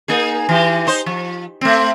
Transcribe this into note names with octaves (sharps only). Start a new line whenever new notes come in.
A#3 D#4 G#4
E3 G4
D#4 C5
F3
A3 C4